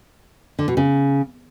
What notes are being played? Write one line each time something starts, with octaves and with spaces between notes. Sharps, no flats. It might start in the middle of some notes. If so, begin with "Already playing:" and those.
D3
B2
C#3